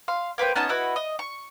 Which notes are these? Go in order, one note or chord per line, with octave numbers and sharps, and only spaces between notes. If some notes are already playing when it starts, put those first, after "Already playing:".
F5 C6
A#3 B4 C5 G5
B3 C#4 D#4 A5
E4 F#4 B4 D#5
D#5
C#6